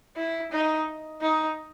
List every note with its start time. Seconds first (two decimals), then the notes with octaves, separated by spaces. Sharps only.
0.16 E4
0.52 D#4
1.21 D#4